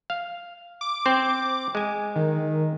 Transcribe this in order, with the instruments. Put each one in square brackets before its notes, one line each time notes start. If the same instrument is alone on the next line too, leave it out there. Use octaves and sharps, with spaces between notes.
[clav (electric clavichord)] F5
[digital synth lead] D6
[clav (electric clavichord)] C4 C5
G#3 G#5
[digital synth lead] D#3